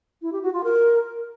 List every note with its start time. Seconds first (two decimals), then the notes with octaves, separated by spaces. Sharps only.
0.22 E4
0.32 G4
0.43 F#4
0.53 F4
0.64 A#4